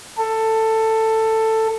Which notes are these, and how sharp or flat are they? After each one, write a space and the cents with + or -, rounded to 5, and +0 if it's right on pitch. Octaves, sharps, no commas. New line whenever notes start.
A4 +15